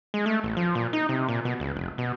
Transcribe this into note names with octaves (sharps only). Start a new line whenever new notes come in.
G#3
A3
A1
F3
A#2
D#4
C3
A#2
B2
C#2
F1
B2